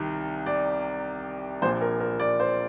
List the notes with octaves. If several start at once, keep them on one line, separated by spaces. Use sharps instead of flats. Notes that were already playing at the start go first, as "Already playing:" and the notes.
Already playing: C2 C3 D#3 G3
D5
A#1 A#2 F3 C5
A#4
A#4
D5
C5